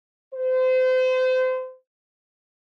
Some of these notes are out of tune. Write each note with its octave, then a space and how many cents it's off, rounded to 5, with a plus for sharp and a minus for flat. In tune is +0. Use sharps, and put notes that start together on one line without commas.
C5 -30